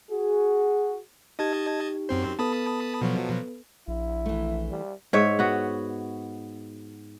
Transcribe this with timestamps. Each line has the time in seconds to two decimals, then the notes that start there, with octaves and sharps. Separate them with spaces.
0.11 F#4 G#4
1.39 D#4 G4 D#5 A5 G#6
2.09 F#2 C4 C5
2.39 B3 A4 B4 A5 B5 D#6
3.01 B2 F3 F#3
3.88 A#1 E4
4.26 E3 A3
4.70 G3
5.13 G#2 C#5 E5
5.39 B3 F#4